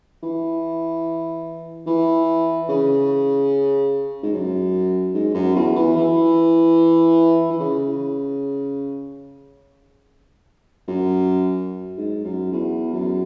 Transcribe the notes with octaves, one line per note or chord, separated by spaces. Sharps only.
E3
E3
C#3
G#2
F#2
G#2
F#2
E2
E3
E3
E3
C#3
F#2
G#2
F#2
E2
F#2